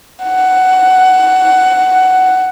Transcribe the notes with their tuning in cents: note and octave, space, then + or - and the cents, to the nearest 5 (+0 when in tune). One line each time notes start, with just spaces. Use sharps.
F#5 +10